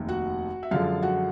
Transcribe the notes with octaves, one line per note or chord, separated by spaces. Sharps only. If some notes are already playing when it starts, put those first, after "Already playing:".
Already playing: F1 D#2 D#3
F#4 F#5
E5
F#2 D3 F3 G#3 F4 F5
F#4 F#5